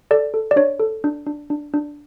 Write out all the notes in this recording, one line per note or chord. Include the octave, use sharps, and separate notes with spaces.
A4 D5
A4
D5
D4 C#5
A4
D4
D4
D4
D4